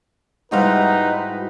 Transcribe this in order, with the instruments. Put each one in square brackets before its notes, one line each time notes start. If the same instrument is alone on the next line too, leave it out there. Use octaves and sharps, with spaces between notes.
[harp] G#2 G3 E4 [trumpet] D#4 [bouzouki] F#4 C5 F5 [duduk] B4